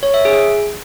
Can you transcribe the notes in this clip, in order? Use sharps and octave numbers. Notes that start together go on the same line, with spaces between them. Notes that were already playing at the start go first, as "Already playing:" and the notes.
C#5
E5
G#4